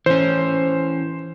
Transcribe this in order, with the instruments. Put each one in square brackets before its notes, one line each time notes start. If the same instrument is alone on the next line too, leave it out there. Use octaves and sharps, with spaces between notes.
[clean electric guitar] E3 C#4 [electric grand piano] C5